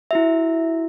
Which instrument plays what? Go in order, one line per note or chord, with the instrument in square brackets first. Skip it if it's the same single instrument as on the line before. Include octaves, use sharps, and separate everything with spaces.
[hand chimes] E4 F#4 E5